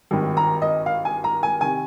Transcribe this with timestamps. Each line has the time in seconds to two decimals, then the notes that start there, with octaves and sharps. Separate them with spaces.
0.11 G#1 G2 D#3
0.37 A#5
0.62 D#5
0.86 F5
1.05 G#5
1.24 A#5
1.43 G#5
1.61 C3 D#3 G#5